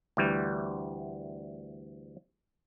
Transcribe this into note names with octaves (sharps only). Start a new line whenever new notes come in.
D2 E3 G3